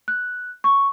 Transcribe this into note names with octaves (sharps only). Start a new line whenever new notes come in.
F#6
C#6